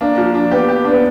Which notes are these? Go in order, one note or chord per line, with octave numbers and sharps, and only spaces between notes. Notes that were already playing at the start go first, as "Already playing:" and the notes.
A#3 D4
F3
D4
B3 G4
G4
D4
B3